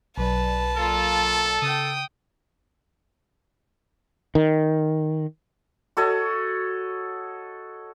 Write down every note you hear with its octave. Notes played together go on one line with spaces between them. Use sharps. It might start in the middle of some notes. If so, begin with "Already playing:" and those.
B1 F#3 B4 D5 A5
A#3 F4 A4
C#3 G5 D#6
D#3
F#4 A4 C#5 D#5